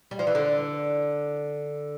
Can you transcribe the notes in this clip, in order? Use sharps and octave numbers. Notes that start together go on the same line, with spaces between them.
G3
F3
E3
D3